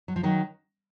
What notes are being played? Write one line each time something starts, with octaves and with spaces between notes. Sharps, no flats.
F#3
F3
D#3 F#3